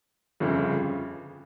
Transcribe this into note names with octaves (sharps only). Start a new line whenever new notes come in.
G1 F2 C#3